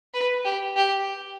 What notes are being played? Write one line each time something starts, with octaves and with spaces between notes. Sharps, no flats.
B4
G4
G4